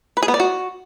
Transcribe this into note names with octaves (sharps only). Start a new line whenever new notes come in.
B4
G#4
B3
D5
F#4